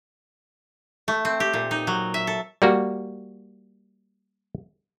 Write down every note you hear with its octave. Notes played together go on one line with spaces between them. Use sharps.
A3
C4
G4
A#2
D#4
F#3
E5
A4
G3 A#3 F#4